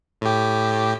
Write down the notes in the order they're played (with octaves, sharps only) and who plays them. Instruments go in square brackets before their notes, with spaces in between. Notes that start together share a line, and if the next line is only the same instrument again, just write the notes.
[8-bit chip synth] A2 G4